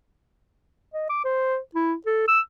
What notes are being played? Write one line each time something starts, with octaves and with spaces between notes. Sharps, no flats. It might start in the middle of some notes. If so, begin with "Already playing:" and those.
D#5
D6
C5
E4
A4
E6